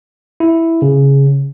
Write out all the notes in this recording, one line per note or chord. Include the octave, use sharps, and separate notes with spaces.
E4
C#3